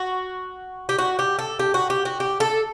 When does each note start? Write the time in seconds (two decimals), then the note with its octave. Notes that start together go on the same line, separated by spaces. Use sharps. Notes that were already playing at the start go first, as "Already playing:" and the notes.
Already playing: F#4
0.89 G4
0.98 F#4
1.19 G4
1.39 A4
1.59 G4
1.74 F#4
1.90 G4
2.05 F#4
2.20 G4
2.40 A4